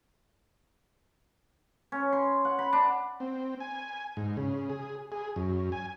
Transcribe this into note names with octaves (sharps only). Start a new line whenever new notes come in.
C#4
C6
F#5
B5
D4
C4
G#5
G#2
C#3
G#4
G#4
F#2
G#5